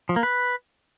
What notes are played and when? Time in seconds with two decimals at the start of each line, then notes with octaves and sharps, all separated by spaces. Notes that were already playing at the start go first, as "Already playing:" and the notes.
0.09 F3
0.16 A#3
0.23 B4